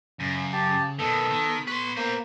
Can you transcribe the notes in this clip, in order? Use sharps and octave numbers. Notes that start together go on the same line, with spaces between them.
F#2 C#3
G4 A5
B2 D#3 B3 A4
D#3
B4 C6 C#6
A#3 C5 A#5